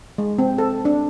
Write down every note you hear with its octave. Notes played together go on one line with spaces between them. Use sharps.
G#3
C4
A4
D4